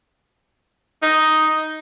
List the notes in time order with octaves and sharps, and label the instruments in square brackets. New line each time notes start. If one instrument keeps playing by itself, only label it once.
[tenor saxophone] D#4